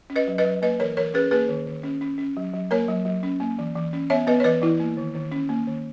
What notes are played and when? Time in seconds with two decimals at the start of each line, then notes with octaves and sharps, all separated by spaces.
0.10 C#4
0.16 B4 D#5
0.28 F#3
0.38 B4 D#5
0.45 F#3
0.62 A#3 B4 D#5
0.80 E3 A#4 C#5
0.97 E3 A#4 C#5
1.14 C#4 G#4 B4
1.31 A#3 G#4 B4
1.49 D#3
1.66 D#3
1.83 C#4
2.01 C#4
2.18 C#4
2.37 F#3
2.53 F#3
2.71 A#3 A#4 C#5
2.88 F#3
3.05 F#3
3.23 C#4
3.40 A#3
3.58 E3
3.75 E3
3.93 C#4
4.10 B3 C#5 E5
4.27 B3 B4 D#5
4.40 C#5
4.44 E3 B4 D#5
4.62 E3 E4
4.80 A#3
4.97 D#3
5.15 D#3
5.32 C#4
5.49 A#3
5.67 D#3